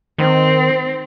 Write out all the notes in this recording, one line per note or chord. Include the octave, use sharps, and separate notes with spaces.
D#3 C4